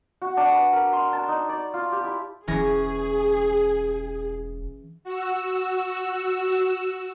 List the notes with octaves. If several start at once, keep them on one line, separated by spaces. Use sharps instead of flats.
F#4
D4
B4
A#4
C6
A5
D#4
D5
F4
G4
E4
E1 E3 C#4 G#4 A#6
F#4 E6